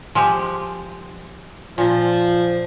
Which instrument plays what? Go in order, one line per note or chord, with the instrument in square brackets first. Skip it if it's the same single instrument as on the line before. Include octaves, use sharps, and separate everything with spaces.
[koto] F3 G#3 G4
[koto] A#2 [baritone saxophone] F3